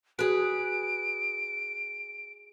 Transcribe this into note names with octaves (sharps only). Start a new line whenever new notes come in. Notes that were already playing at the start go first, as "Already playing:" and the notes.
F#4 G#4 B4 D7